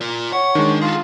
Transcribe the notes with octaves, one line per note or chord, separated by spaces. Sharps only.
F4 A#4
C#5 F#5
D#3 G#3 D4
F4 G#4 A4